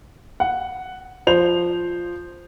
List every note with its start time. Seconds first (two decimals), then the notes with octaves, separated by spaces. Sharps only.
0.40 F#5
1.27 F3 C5 F7